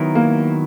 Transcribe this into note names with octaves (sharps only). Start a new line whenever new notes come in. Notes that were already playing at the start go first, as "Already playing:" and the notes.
Already playing: D#3 F#3 B3 E4 A#4
A#3